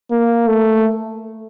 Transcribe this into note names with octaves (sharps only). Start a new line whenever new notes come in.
A#3
A3